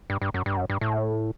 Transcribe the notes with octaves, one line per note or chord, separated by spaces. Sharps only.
G2
G2
F#2
G2
F#2
G2
A2